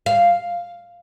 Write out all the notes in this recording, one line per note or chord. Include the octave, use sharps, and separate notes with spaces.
F5